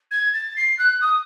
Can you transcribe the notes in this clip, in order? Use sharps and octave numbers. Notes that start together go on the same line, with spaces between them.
G#6
A6
C7
F#6
D#6